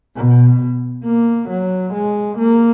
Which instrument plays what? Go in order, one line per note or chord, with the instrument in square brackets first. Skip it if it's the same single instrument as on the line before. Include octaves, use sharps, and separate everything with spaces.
[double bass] B2
A#3
F#3
G#3
A#3